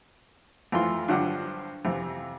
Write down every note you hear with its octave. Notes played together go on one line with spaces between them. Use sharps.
F2 E3 A3 F4 C6
G2 D3 F3 F#3 D4 F#5
F2 C3 E3